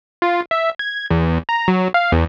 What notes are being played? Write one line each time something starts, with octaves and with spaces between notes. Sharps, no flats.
F4
E5
G#6
E2
A#5
F#3
F5
E2